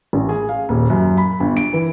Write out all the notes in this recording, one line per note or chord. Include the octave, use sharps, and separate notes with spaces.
A1
G#4
F5
D#1
F#2
B5
G1
D7
E3